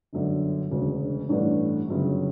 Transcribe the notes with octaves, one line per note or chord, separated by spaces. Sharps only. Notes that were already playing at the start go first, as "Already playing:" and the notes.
G1 F#2 D3
E1 D2 C#3
A1 G2 E3 A3 D4
G1 F#2 C#3